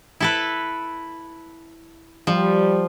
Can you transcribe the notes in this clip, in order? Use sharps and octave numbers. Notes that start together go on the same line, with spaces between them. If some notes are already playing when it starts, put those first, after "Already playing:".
E4 A4 B4
F3 G3